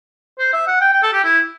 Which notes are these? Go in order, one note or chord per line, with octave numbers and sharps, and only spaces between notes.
C5
E5
F#5
G5
G5
A4
G4
E4